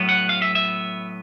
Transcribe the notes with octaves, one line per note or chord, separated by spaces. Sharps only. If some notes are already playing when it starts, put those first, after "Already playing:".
Already playing: A2 F#3 B3
F#5
F5
E5
E5